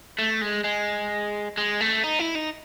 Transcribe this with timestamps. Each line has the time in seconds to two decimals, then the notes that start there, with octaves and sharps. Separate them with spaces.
0.19 A3
0.41 G#3
0.64 G#3
1.58 G#3
1.81 A3
2.04 D#4
2.19 E4
2.35 D#4